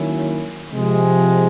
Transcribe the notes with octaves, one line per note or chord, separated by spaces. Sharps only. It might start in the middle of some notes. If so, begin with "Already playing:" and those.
Already playing: D#3 F#3 A#3 C#4 E4
C3 F3 G#3